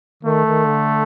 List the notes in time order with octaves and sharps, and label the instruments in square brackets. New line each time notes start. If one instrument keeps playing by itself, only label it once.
[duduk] D#3 [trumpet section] A3
[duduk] D#3
D3